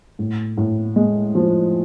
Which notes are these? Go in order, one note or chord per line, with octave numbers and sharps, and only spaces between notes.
A2
A2
G#3
F3